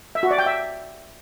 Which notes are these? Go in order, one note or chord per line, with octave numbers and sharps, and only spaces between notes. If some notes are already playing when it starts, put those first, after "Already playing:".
E5
F#4
D5
G5
E5